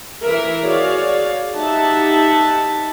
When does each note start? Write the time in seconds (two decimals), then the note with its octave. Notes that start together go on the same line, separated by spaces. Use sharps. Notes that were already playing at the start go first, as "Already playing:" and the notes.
0.24 E3 A#4 E5
0.65 F#4 G#4 C#5 D5 F5
1.56 D#4 G4 E5 F#5 A5